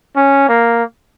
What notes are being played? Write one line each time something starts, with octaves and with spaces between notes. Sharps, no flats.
C#4
A#3